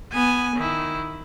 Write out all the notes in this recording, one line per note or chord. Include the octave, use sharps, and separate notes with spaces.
B3 G#5
D#3 E4